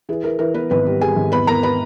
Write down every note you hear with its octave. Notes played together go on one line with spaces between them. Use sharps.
E3 G#4
E3 A#4
E3 A#4
E3 B3 B4
G#1 B3 B4
G3
G3 G#4 G#5
G#1
E2 B4 B5
E2 A#4 A#5
B4 B5